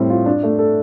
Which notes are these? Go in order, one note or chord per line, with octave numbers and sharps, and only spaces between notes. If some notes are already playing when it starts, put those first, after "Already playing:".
Already playing: A2 G3 C4
F4
D4
A3
A4